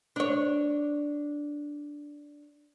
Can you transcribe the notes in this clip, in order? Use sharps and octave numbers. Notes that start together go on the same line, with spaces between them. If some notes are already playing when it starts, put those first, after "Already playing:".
D4 C#5